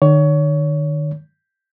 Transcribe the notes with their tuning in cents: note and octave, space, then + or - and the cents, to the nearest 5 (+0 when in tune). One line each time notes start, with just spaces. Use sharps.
D#3 -45 C#5 +25